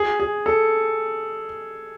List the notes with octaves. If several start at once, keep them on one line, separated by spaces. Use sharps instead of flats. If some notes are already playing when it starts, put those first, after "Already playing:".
Already playing: G#4
G#4
A4